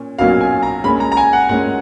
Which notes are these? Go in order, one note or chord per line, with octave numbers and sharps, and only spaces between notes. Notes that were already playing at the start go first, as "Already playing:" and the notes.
Already playing: A#2 C#4
B1 A#2 F#3 C#4 F#4 F5
G#5
A#5
A#2 G#3 C#4 B5
A#5
A#5
G#5
F#5
A#2 G#3 C#4 F#5